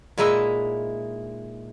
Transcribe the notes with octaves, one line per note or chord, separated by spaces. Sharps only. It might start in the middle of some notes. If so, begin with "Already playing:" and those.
A#2 G#3 D#4 E4 D#5 E5